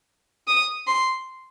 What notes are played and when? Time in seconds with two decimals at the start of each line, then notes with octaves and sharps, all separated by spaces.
0.48 D#6
0.87 C6